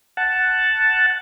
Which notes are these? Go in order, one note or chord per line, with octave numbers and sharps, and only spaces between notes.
F#5 A5